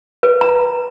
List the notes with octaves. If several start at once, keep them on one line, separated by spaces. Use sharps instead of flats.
B4
A#5